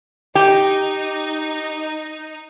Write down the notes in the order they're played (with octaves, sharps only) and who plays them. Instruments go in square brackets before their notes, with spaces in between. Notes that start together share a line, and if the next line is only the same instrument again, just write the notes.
[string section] D#4 [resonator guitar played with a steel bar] G4